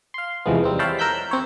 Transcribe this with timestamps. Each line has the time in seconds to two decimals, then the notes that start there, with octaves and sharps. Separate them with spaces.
0.14 F5 C6
0.46 E2 C3 E3 F3 G#3 B3
0.64 G3 C4 D#4
0.79 C#5 E5 F5 G5 A5 B5
0.99 A#4 E6 F#6 G6 B6
1.31 C4 C#5